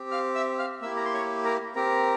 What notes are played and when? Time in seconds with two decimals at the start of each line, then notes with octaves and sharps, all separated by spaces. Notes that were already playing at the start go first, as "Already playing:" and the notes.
Already playing: C4 G4
0.11 F5 F6
0.35 E5 E6
0.59 F5 F6
0.82 A#3 E4 G4 E5 E6
0.96 A#5
1.05 C6
1.14 C#5 C#6
1.45 A#4 A#5
1.75 C4 G4 A#4 A#5